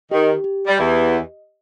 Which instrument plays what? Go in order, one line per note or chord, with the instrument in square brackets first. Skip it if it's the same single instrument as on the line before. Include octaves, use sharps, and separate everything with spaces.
[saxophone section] D#3 [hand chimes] G4
[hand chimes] G4
[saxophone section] G3
[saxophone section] E2 E3 [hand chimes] D#5